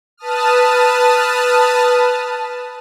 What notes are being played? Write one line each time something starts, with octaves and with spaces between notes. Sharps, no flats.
B4 A5 D#6 F6